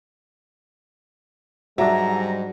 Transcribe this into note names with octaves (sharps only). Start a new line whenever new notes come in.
G#2 F#3 G3 D4 E5 A#5